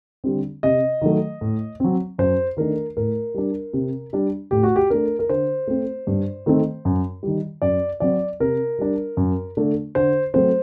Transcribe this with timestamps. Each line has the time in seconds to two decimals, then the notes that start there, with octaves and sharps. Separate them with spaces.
0.24 D3 G3 C4
0.63 C3 D#5
1.02 D#3 F#3 A3
1.41 A2
1.80 F#3 C4
2.18 F#2 C5
2.57 D#3 A3 D4 A#4
2.97 A2 A#4
3.34 G3 D4
3.73 C3
4.13 G3 D4
4.51 A2 G4
4.63 F#4
4.76 G4
4.90 A3 D4 A#4
5.19 A#4
5.29 D3 C5
5.67 A3 C4
6.07 G2
6.46 D#3 A3 C4
6.85 F#2
7.23 D#3 G3
7.62 F#2 D5
8.00 F#3 C4 D5
8.40 C3 A#4
8.79 G3 D4
9.17 F#2
9.57 D3 A3 D4
9.95 D3 C5
10.34 F#3 A3 C4 C5